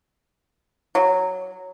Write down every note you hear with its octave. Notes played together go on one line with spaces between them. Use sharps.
F#3